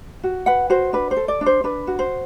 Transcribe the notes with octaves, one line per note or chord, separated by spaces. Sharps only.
F#4
B4 F#5
F#4 C5
D4 B4
C5
A4
D5
D4
C5
D4 B4
F#4
C5